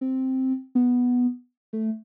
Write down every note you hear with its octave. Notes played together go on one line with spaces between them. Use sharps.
C4
B3
A3